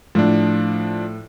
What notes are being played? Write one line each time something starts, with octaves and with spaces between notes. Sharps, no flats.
A2 F3 D4